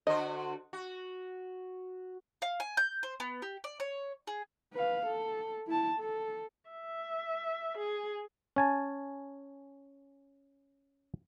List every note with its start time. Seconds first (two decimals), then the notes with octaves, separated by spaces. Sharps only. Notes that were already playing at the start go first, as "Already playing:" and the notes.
0.07 D3 F#4 C5 D#5
0.73 F#4
2.42 F5
2.60 G#5
2.77 G6
3.03 C5
3.20 B3
3.42 G4
3.64 D5
3.80 C#5
4.27 G#4
4.74 B4 F5
5.06 A4
5.67 E4 A5
5.99 A4
6.70 E5
7.78 G#4
8.56 C#4 G#5 A5